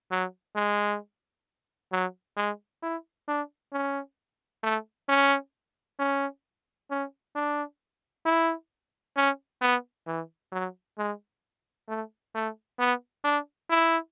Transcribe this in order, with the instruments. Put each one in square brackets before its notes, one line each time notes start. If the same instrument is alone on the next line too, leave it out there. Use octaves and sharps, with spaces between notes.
[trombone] F#3
G#3
F#3
G#3
E4
D4
C#4
A3
C#4
C#4
C#4
D4
E4
C#4
B3
E3
F#3
G#3
A3
A3
B3
D4
E4